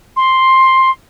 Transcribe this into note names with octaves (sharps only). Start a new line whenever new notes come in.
C6